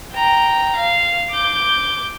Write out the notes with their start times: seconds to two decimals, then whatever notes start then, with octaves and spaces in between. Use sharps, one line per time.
0.14 G5 A#5
0.75 F5
1.32 D6 G6